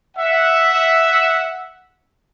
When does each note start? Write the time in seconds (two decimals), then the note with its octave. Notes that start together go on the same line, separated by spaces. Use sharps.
0.17 E5 F#5